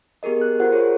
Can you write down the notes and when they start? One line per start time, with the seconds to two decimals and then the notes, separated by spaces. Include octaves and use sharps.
0.23 B3 G4 G#4 A#4 D#5
0.41 F#6
0.60 F4 G4 A#4 C5 F#5
0.72 G4 G#4 A#4 C5 C#5